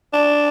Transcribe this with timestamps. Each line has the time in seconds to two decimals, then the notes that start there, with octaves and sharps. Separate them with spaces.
0.13 D4